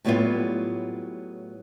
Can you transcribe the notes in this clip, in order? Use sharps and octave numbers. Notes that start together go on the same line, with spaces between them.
A2 F#3 G3 B3 E4 F4